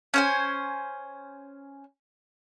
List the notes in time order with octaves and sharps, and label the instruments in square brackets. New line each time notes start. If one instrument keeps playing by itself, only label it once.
[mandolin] C#4 C5 G#5